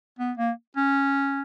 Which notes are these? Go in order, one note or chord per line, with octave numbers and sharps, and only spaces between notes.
B3
A#3
C#4